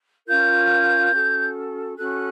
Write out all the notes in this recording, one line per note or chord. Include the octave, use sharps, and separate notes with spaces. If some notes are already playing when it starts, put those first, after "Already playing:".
C#4 F4 A#4 G6
C#4 F#4 A4
C#4 F#4 A4 F#6